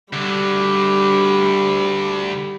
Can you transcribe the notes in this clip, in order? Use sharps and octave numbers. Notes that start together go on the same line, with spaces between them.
D2 D3 G3 B5